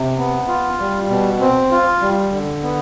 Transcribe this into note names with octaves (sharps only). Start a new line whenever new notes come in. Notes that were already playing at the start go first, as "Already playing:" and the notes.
Already playing: C3
B3
F4
G3
B2
C4
F4
G3
D3
B3